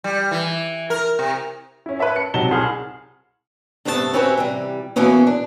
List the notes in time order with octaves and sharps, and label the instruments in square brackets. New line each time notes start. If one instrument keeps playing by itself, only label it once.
[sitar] G3
E3
A#4
C3
[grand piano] C#4 E4
B4 C#5 E5 A5
C#7
C3 F#3 D#4 A5 E7 G7
C2 G#4 F6
[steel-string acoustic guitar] G2 C3 A3 B3 G4 A5
C4 C#4 E4 F#4 G4 B4
C3 E3 G3
B2 E3 A#3 B3 C#4
D4